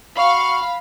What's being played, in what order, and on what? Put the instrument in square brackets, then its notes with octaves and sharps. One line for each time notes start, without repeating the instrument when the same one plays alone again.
[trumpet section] F#4 C#6 [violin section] F5 [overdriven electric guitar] B5